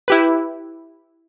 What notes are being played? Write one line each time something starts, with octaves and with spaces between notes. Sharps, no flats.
E4 G4 B4